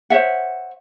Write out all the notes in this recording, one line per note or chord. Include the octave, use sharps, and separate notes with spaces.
C5 C#5 E5 F#5